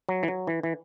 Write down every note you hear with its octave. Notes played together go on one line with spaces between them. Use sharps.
F#3
E3
F#3
E3
E3